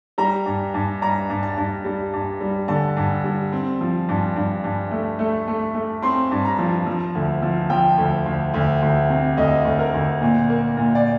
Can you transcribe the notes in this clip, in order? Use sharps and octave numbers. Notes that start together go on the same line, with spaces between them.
G3 A#5
G2
G2
G2 A#5
G2
A5
G2
G3
G2
G3
D3 A5
G2
G3
C4
F3
G2
G2
G2
A3
A3
A3
A3
C4 C6
G2
A#5
F3
F3
D2
F3
F3 G5
D2
D2
D2
D2
C3
D2 D#5
D2
A#4
D2
A#2
A#3
A#2
D5